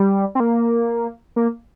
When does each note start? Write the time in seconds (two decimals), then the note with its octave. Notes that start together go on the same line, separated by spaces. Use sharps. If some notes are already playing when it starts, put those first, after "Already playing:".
Already playing: G3
0.35 C4
0.40 A#3
1.36 A#3